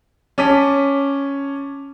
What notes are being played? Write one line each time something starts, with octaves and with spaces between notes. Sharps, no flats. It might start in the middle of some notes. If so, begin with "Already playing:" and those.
C#4 A5 D6 B6 D#7